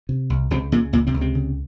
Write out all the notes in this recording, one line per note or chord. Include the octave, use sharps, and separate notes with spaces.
C3
C2
C#2 C3 C4
A#2 C#3 A#3
C#2 A#2 A#3
C3 C4
C#2
C3 C4
C#3